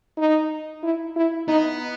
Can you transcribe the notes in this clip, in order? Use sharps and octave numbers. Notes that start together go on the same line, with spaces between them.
D#4
E4
E4
B3 D#4